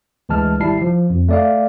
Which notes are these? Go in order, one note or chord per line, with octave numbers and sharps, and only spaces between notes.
D2 E3 G#3 A5 F6
G#1 G3 E4 A5 C7
F3
F2
A3 D5 F5